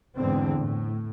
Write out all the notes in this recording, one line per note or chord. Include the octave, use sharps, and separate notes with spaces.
E2 G#2 D3 E3 C4
A2